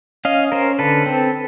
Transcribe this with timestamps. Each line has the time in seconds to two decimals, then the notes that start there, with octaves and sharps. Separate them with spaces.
0.25 C#4 D#5 F5
0.52 C#4 A#4 C5
0.79 D3 A4 B4
1.06 C4